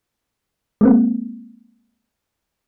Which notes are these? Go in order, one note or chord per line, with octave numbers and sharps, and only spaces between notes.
G#3 A#3 C4